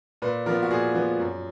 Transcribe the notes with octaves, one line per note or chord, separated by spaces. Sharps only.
A#2 B4
F3 B3 A#4
F#4
A#2 G#4
F3 B3
F#2